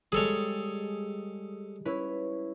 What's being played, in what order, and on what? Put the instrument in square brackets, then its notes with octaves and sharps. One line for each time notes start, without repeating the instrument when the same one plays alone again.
[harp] G3 G#3 [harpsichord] G#4 A4 C#5
[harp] C#4 E4 B4